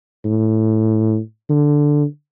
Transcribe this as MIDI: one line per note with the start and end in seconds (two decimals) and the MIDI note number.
0.25 1.18 45
1.50 2.04 50